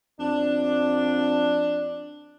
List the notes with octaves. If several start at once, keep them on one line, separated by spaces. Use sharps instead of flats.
F2 D4